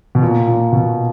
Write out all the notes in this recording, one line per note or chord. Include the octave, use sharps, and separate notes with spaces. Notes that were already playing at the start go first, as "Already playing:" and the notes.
B2
A#2
A#2
B2